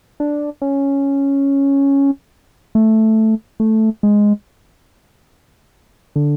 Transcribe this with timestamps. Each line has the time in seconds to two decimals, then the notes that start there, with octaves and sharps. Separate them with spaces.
0.20 D4
0.62 C#4
2.75 A3
3.60 A3
4.03 G#3
6.16 D3